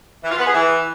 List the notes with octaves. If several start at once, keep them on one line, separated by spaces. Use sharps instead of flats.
E3
F4
B3
G#4
E3